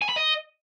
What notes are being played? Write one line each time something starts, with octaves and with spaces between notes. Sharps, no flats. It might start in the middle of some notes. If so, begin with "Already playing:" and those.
G#5
B5
D#5